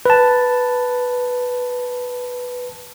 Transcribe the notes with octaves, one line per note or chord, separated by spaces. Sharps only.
B4 A5